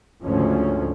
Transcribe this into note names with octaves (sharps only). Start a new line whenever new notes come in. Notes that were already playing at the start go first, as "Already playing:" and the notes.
D2 G#2 C#3 F3 C#4